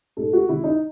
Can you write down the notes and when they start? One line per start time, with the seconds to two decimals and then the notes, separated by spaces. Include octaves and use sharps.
0.17 A2 G#3 D#4 A4
0.33 F#4
0.48 C3 D#3 G#3 E4
0.64 D#4